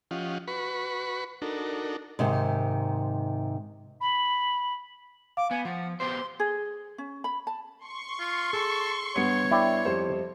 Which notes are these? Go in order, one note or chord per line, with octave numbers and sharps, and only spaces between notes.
F3 C#4 F4 G4 D#5 F#5
F#4 B4 B5 C#6
D4 D#4 F#4 A4 A#4
G#2 C3 D#3
B5
F5 D6
B3 G#5
F3 F#5
B3 G4 C5 C6
G#4
C#4
B5
A5
C6 C#6
F4
G#4 A4
G2 B3 C#5 C#7
E4 D5 G5
F2 G3 C5